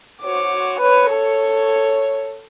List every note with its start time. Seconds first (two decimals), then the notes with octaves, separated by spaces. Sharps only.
0.23 F#4 C5 C#5 D6
0.80 B4 C#5
1.11 A4